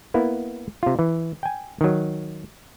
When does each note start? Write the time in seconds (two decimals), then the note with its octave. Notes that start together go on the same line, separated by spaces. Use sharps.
0.14 A#3 B3 E4
0.83 C3 F4
0.99 E3
1.43 G5 G#5
1.81 D#3 F#3